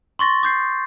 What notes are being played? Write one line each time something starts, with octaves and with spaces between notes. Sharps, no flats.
C6 C#6 A6 A#6
D6 G6 C7